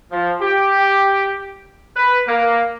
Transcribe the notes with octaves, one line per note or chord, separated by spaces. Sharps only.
F3
G4
B4
A#3